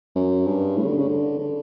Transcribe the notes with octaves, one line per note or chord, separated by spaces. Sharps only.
F#2
G2
A2
C#3
D3
C#3
D3
D3